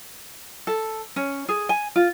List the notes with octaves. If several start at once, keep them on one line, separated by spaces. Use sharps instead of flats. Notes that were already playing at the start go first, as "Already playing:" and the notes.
A4
C#4
G#4
G#5
F4